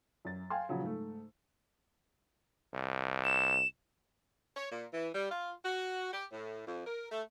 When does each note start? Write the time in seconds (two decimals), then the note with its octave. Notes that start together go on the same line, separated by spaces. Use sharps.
0.25 F#2 A6
0.50 F5 G5 G#5 C6
0.69 A#2 C#3 F3 F#3
0.82 G#2 A3
2.74 C2
3.24 E7
4.56 C#5
4.72 A#2
4.94 E3
5.15 G3
5.31 F4
5.65 F#4
6.13 G4
6.32 A2
6.67 F2
6.87 A#4
7.12 A3